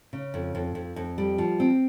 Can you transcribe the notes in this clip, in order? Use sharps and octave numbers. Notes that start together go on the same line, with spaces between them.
C#3
F2
F2
F2
F2
G3
F3
C4